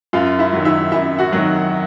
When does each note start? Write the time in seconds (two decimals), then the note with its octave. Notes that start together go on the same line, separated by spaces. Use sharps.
0.13 F#2 F4 F5
0.39 E4 E5
0.53 D#3 F#3
0.65 E4 E5
0.92 F#2 E4 E5
1.19 F#4 F#5
1.32 D#3 F#3